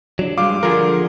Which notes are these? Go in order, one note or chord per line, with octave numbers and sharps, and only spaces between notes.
F#3 D4
G2 G#3 F4 F5 D6
D3 F3 G#4 A#4